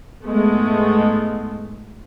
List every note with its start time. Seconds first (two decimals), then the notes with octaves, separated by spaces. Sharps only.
0.23 G#2 G#3 A3 B3